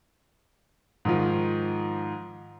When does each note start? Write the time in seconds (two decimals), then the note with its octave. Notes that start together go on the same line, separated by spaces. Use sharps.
1.05 G#2 D#3 F3